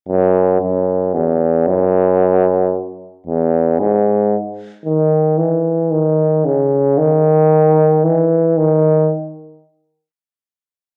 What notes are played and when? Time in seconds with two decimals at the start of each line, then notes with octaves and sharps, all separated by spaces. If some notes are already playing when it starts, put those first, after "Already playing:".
0.08 F#2
0.61 F#2
1.14 E2
1.67 F#2
3.27 E2
3.80 G#2
4.85 D#3
5.38 E3
5.91 D#3
6.45 C#3
6.98 D#3
8.04 E3
8.57 D#3